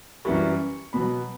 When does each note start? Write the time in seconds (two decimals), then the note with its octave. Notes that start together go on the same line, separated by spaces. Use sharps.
0.25 F#2 E3 G3 C#6
0.93 B2 F#3 B5